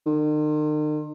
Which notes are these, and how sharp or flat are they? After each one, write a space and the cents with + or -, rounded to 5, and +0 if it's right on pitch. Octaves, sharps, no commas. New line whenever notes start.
D#3 -45